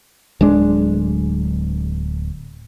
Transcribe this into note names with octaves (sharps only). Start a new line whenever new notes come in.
D1 G#3 D4